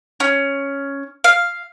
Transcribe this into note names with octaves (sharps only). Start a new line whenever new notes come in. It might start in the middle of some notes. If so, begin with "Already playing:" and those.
C#4
F5